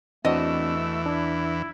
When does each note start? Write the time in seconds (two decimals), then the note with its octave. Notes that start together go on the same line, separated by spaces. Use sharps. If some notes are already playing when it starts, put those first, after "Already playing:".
0.25 E2 E3 A3 C4 D4 F#4 D#5 E6
1.06 D4 E4